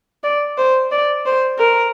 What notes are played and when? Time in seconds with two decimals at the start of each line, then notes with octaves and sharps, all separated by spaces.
0.24 D5
0.58 C5
0.91 D5
1.26 C5
1.59 A#4